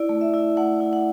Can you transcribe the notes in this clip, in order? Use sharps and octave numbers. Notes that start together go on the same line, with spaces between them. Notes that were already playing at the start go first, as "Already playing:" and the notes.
Already playing: E4 D5
A3
E5
E4
A3 F#5
E4
F#5